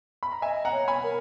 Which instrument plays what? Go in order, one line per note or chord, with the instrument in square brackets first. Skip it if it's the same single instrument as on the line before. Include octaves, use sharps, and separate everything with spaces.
[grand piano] B5
A#5
[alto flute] D#5 [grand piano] E5 G#5
[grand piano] F#5 A#5
[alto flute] C#5
[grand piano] G#5 B5
[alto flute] A#4